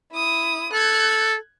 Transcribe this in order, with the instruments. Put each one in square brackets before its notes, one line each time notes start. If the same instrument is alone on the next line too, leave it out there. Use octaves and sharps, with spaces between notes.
[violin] E4 D#6
[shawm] A4 [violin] F#6 G#6